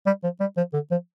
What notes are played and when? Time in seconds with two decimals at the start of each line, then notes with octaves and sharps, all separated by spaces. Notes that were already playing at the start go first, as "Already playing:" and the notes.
0.06 G3
0.24 F3
0.40 G3
0.57 F3
0.74 D3
0.91 F3